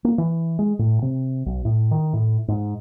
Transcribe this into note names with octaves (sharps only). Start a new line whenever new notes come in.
A#3
E3
G#3
A2
C3
B1
A2
D#3
A2
G#2